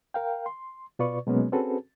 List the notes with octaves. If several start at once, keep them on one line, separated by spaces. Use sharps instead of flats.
A#4 F5 G5
C6
B2 F4 B4 D5 C#6
B2 F#3 G#3 A#3 B3 C#4
C4 C#4 F#4 G#4 A4 B4